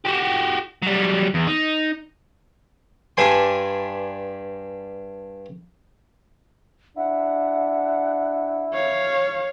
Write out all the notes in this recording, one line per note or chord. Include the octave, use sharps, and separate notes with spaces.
F#4 G4
F#3 G3
E2
D#4
G2 D4 B4 G#5 C6
D4 E4 F#5
C#5 F5